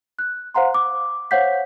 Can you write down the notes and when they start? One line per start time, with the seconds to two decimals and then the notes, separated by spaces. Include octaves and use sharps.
0.19 F#6
0.54 C5 F5 F#5 A#5 C6
0.74 D6
1.31 C5 C#5 F5 F#5 G6 B6